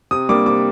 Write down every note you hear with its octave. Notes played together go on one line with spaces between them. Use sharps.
C3 D#6
G3 A#3 D4 D6
C3 D6